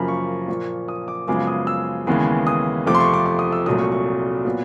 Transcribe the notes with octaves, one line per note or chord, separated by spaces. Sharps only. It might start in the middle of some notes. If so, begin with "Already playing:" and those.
Already playing: F#2 C#3 F3 A#3 A#5 B5
C#6
A#2 F3 A#3 C#6
D#6
D6
F#2 C#3 F3 G#3 B3 D6
D#6
E6
D#2 C#3 E3 G#3 B3
D#6
F2 C3 F3 A3 D6
C6
C#6
D6
D6
D#6
E6
C2 A#2 F#3 A3 D#6
C#6
C#6
A#2 F#3 B3